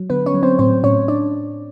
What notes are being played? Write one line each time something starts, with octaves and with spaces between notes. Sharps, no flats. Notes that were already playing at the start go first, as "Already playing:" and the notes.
Already playing: F#3
D3 B3 B4
C#4 C#5
F#3
C4 C5
A2 C4 C5
A2 C#4 C#5
D4 D5